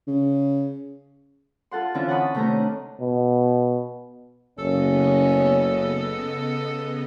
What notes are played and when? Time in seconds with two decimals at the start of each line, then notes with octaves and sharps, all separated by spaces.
0.07 C#3
1.71 F4 A4 F#5 C6
1.94 D3 E3 C4 C#4 E4 F4
2.09 F#5 A5 B5 C#6 D#6
2.35 C3 D#3 A3 C#4 A#5
2.53 D4
3.01 B2
4.58 F#1 C#3 B3 C#4 A4 D#5